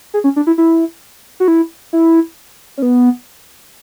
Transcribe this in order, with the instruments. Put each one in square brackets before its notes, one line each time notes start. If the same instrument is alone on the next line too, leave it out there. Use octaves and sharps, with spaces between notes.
[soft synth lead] G#4
C#4
D4
E4
E4
F#4
E4
E4
C#4
B3